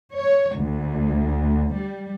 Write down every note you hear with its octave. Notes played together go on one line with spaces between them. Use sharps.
C#5
D2
G3